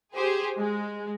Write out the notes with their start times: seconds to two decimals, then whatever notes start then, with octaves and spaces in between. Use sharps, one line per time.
0.15 G4 G#4 C5
0.56 G#3